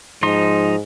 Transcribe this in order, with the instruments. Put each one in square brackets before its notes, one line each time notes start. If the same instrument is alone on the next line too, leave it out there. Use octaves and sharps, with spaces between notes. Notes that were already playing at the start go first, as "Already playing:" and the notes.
[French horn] G#2 [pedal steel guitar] F3 D#4 C6